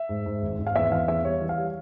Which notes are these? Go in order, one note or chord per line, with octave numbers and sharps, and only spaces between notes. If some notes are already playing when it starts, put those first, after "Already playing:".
Already playing: E5
G#2
G#2
G#1
G#1
F5
E2 E5
E3 F5
E2 E5
G3 C#5
E3
F5
G3